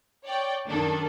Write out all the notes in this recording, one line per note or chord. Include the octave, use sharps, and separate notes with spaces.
C#5 D5 G5
F#2 D#3 A#3 D4 A4